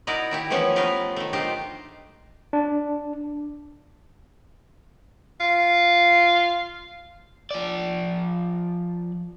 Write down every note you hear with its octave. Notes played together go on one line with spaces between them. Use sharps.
D#4 E4 F#4 A#4 D5 D#5
D#3 E4 G4
E3 F3 A3 B3 C#4
F3 A3 B3 F4 A#4 B4
D#3 A3
D4 D#4 F4 G4 C5
D4
F4
F3 D5